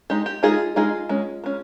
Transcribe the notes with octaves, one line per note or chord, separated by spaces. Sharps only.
G#3 D#4 G4
G4
G#3 D#4 F4 G#4
G#3 D#4 F4 G#4
G#3 C#4
G#3 C#4